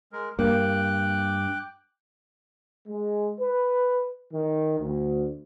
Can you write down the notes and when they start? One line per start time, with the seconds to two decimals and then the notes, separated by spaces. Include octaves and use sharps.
0.12 G#3 A#4
0.39 G2 A#3 G5 D6 F#6
2.87 G#3
3.40 B4
4.33 D#3
4.80 D2